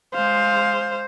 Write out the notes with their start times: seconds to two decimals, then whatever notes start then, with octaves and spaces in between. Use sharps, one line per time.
0.14 G#3 C5 F5